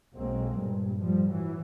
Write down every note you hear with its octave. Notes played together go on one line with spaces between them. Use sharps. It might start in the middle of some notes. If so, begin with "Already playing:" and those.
B1 F#3 G#3 A#3 C4
G2 A#2
A2 F3 G3
E3 F#3